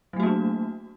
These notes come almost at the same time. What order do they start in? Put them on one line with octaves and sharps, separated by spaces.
F#3 A3 F#4 A#3 D4